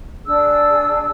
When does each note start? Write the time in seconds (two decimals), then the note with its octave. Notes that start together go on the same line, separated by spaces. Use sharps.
0.25 D4 G#4 E6